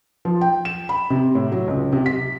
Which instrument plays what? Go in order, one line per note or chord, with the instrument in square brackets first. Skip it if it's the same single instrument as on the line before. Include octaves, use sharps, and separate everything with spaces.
[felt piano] F3
G5
E7
B5
C3
A2
F#3
C#2
C3
B6